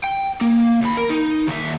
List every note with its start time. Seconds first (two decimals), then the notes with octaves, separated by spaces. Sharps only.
0.04 G5
0.41 A#3
0.82 D#2 B5
0.97 A#4
1.10 D#4
1.47 D#2 E5